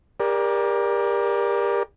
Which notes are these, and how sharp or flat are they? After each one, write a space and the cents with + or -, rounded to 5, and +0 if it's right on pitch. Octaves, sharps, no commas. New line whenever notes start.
G4 +35 A#4 +20 D5 +0